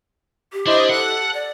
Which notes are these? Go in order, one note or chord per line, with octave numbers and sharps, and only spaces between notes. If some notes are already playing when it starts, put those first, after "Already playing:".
G4
D4 E4 C5 D#5
A4 F#5 F#6
D5